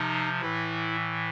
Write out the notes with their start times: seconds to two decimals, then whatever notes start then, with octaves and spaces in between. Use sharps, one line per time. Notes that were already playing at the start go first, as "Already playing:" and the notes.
Already playing: C3 F3 D#4
0.41 A2 E3 E4